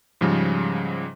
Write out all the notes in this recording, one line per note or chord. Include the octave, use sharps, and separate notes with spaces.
G#2 C#3 F3 G3